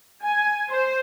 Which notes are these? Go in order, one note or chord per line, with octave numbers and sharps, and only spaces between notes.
G#5
C5